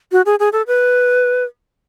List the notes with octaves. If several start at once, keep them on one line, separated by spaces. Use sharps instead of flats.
F#4
G#4
G#4
A4
B4